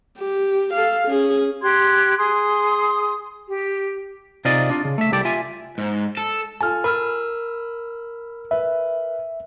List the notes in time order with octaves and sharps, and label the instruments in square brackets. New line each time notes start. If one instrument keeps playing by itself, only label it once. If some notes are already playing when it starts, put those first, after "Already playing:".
[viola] G4
A4 F5
C#4 G#4
[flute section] G4 C6 F#6 G#6
G#4 C6 D#6
G4
[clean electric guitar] C3 D#4 F4 G#4 D5 D#5
D4 F4
C#3
A3 E5
C2 G3 G4 A4 D5
F4 E5 G#5
[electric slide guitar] G#2
A4
[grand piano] F4 A4 G#5 [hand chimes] A5 F6
[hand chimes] A#4 E6 F6 [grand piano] B5
[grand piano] B4 [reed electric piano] E5